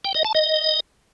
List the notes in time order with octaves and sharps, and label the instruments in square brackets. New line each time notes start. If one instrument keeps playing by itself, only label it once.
[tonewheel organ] G5
D#5
A5
D#5